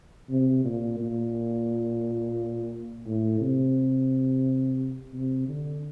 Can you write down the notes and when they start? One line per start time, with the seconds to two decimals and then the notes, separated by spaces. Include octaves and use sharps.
0.30 C3
0.65 A#2
0.98 A#2
3.06 A2
3.41 C3
5.14 C3
5.48 D3